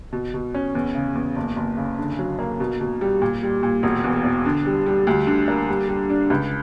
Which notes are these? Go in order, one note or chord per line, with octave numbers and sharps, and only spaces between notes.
B2
B2
C#4
E2
C#3
E2
F#1
F#1
C#3
D3
F#3
A#3
B2
B2
G3
A#2
G3
A#2
E1
E2
E1
D3
G3
G3
D2
D3
A#3
G3
G3
D4
C#2